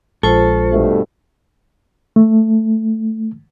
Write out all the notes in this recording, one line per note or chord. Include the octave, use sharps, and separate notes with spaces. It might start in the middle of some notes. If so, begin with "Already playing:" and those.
A#1 G#3 F4 A4 C5 C#6
G2 B2 A3
A3